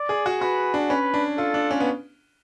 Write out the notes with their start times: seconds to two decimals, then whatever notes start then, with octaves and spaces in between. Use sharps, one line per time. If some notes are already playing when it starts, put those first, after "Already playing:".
Already playing: D5
0.09 G#4
0.26 F#4
0.41 F#4 B4
0.74 D4
0.90 C#4 B4
1.14 D4
1.38 F4 A4
1.54 D4
1.71 C#4
1.80 B3